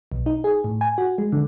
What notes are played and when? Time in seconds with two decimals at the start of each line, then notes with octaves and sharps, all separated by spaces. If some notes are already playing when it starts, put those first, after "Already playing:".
0.12 B1
0.26 D#4
0.44 G#4
0.64 A2
0.81 G#5
0.98 F#4
1.18 G#3
1.32 D3